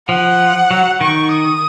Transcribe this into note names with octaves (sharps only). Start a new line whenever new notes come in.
F3 F#5
F#3
D#3 C#6
D#6